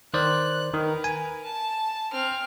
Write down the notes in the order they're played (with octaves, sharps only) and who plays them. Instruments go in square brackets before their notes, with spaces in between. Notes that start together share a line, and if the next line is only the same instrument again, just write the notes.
[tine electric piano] D#3 C5 D5 [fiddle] F#6
[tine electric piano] D#3 [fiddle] A#4 B4
[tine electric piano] G#5
[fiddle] A5
C4 F6